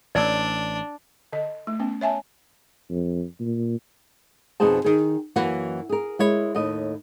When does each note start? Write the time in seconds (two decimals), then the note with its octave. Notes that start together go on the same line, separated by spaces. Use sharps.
0.15 A1 D4 D5 E6
1.33 D3 D#5
1.67 A3
1.80 B3 C#4
2.01 C#5 E5 G#5 A5
2.90 F2
3.40 A#2
4.60 F2 B2 D#4 G#4 C5 A5
4.84 D#3 G#4
5.36 F#2 E3 A#3 F#4
5.89 G#4 A#4
6.19 G#3 E4 C#5
6.55 D#2 A2 D#5